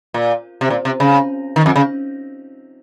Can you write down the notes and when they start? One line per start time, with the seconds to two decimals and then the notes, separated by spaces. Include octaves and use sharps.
0.14 A#2
0.61 C3
0.70 A#2
0.85 C3
1.00 C#3
1.56 D#3
1.66 F2
1.76 C#3